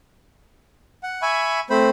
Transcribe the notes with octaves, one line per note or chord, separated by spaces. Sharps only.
F#5
E5 G#5 B5 C#6
A3 C4 C5 B5